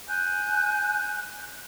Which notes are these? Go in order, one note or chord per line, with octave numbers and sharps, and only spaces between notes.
G#5 F#6 G6